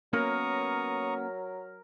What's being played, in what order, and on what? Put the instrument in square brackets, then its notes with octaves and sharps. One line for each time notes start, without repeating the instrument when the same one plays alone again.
[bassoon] F#3 [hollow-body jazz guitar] A#3 B3 C#4 [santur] A#4 [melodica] A#5 C#6 D#6